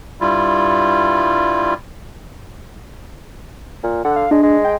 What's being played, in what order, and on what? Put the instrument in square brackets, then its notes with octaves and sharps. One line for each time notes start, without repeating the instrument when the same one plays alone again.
[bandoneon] G2 G3 E4 F4
[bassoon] A#2
[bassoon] D3 [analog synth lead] F#5
[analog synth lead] F5
[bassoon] G#3 [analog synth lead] D4
[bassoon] G#3
[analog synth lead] G5